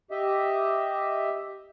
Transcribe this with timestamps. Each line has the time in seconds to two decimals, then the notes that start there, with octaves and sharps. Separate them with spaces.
0.11 G4 D#5 E5